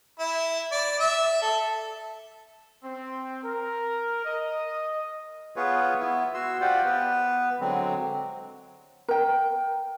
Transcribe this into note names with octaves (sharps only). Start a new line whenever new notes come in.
E4
D5
E5
A4
C4
A#4
D#5
B3 F4 G#4 B4 C#5
B3 E4
F#4 C6 E6
F4 G4 C5 D5 F#5
B3 B4
D3 F#3 G#3 C4
A#4 G5